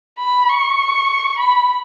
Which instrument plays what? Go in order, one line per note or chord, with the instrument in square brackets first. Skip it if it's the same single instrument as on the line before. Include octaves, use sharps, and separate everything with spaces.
[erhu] B5
C#6
B5